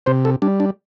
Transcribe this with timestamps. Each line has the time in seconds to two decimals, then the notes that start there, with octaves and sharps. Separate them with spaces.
0.06 C3 C5
0.25 A4
0.42 G3 D4
0.60 D4